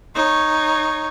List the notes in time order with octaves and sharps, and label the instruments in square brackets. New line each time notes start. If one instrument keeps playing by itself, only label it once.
[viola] D#4 C#5